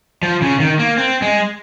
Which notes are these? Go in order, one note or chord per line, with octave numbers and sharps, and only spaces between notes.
F3
C#3
D#3
A#3
C4
G#3